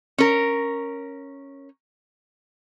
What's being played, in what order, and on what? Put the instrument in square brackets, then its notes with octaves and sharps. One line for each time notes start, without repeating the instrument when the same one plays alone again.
[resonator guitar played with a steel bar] C#4 A#4